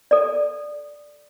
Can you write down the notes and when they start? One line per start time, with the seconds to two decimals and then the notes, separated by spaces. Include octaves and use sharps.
0.11 A4 D5